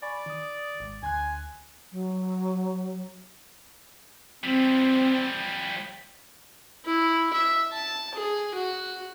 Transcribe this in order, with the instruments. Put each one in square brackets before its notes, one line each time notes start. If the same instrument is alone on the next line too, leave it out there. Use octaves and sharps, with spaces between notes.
[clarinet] D5 [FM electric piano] G#5 B5 C#6
[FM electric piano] D#3 D#6
G#1
[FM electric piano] D2 C6 F#6 [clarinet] G#5
[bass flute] F#3
[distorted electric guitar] F3 G3 [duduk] C4
[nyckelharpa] E4
E5
A5
G#4
F#4